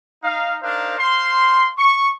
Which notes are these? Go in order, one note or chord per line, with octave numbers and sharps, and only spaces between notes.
D#4 F5
D4 D#4 A#4 C5 F5
C5 F5 C6
C#6